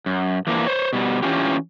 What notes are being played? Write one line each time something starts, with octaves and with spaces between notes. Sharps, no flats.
F#2
E3 F3 A#3 D4
C5 C#5
B2 G3
E3 C#4 D4 F4 G4